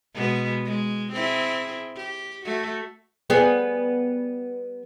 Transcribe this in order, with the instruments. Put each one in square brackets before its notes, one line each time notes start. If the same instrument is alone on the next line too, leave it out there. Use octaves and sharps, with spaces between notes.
[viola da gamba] B2 G#3 B3
G#3
C4 E4 G#4
G4
A3 F#4
[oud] G3 B3 G#4